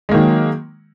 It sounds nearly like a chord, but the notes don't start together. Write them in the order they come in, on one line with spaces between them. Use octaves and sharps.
G#3 A#3 D#3 F#3